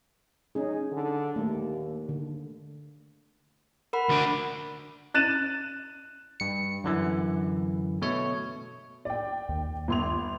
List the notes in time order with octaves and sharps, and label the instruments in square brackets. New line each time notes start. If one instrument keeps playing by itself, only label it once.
[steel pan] C#4 G#4 [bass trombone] D#4
[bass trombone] D3
[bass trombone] D#2 [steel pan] A3 A#3
[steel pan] D3
[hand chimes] A#4 F#5 B5
[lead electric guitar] D2 D4
[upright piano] F#6 A6 D#7 E7
[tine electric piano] G2 C#7
F#2 D3 E3
B2 A3 C#5
[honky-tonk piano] D5 G5
[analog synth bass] D#2
[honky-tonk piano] G1 C6 F7